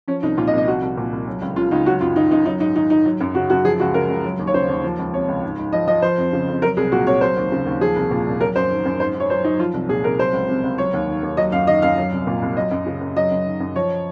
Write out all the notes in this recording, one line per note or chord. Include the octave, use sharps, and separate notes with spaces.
F3 C#4
C2 D#4
A#2 F4
D#5
C2
D#5
F3 F#4
C2
A#2
C2
F#3
C#2
C#3 F4
C#2 D#4
F#3 F#4
F#2 F4
D#3 D#4
F#2 D#4
F#3 D#4
G#2 D#4
D#3 D#4
G#2 D#4
F#3
F#2
C#3 F#4
F#2 F#4
F3 G#4
C#2 F#4
C#3 A#4
C#2
F#3
D#2
C#5
C#3 C5
D#2
F3
C#2
C3 C#5
C#2
G#2
G#2
F3 D#5
F3 D#5
F3 C5
F2
C#3
F2
F#3 A#4
C2 G#4
A#2 F#4
C2 C#5
F#3 C5
D#2
C#3
D#2
F3 G#4
C2
A#2
C2
F#3 A#4
F#2 C5
D#3
F#2
G#2 C5
G#2
C#5
F#3 C5
F#3 D#4
F3 F4
C2
A#2 G#4
C2 A#4
F#3 C5
C#2
C3
C#2
F#3 C#5
D#2
D#3
D#2
F#3 D#5
F#2 F5
D#3 D#5
F#2 F5
F#3
C2
A#2
C2
F#3 D#5
F#2
C#3
F#2
F#3 D#5
F#2
D#3
F#2
F3 C#5